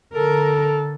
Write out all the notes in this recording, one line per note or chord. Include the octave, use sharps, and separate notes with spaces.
D3 A4 A#4